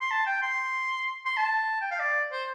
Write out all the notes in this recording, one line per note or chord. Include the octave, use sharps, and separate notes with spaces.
C6
A5
G5
C6
C6
A5
G5
F5
D5
C5